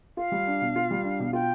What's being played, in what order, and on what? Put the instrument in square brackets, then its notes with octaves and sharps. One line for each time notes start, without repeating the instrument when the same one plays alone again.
[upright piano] F4 [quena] F5
[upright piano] G3
D4
B2
F4
G3
D4
B2
[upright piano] F4 [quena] G5